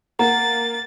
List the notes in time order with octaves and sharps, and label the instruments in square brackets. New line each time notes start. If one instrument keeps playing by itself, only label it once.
[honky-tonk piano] A#3 [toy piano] F#5 A#5 [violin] A6